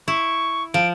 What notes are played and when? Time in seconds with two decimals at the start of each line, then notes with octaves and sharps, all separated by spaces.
0.08 E4 C#6
0.74 F3 D7